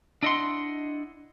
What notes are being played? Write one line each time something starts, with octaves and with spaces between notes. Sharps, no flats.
D4 E4 D#5 E5 F#5 C6